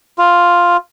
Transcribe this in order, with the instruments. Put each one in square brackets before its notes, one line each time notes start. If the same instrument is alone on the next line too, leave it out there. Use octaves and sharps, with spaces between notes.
[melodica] F4